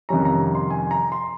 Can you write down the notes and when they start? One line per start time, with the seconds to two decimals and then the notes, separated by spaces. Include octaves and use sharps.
0.09 F2 C3 D#3 G3 C#4 A#5
0.25 A#5
0.55 C6
0.70 G#5
0.91 A#5
1.12 C6